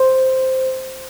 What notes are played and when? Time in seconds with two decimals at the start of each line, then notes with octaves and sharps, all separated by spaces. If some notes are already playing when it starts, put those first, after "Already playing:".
Already playing: C5